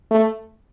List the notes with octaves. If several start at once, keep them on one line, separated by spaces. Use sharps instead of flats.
A3